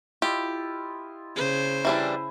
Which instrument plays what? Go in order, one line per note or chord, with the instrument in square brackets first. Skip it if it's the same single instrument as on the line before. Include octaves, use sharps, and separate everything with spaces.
[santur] E4 F4 D#5 [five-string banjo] G4
[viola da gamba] C#3 C5
[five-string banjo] E3 G3 D4 [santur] E4 G#5 A#5